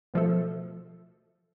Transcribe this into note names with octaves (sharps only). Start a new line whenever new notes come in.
B2 F3 A3 A4